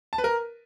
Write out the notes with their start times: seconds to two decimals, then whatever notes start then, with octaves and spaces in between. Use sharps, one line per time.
0.13 A5
0.18 B4
0.24 A#4